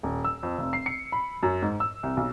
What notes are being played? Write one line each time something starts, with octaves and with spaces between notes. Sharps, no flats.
D#1
E6
F2
F1
C7
C#7
B5
F#2
G#2
E6
C2
B1